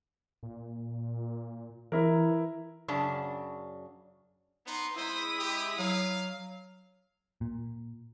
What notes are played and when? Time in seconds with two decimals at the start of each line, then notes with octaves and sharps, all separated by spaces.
0.43 A#2
1.92 E3 E4 A#4
2.88 F#2 C#3 D4 A5
4.67 B3 D#4 C6
4.97 G#3 E4 C5 D#6 B6
5.39 G4
5.79 F#3 F5
7.41 A#2